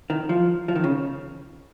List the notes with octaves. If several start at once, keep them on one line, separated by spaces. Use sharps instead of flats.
D#3
F3
F3
D#3
C#3